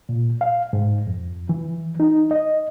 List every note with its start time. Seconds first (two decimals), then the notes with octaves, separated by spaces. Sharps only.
0.09 A#2
0.41 F5
0.73 G#2
1.07 F2
1.49 E3
2.00 D#4
2.31 D#5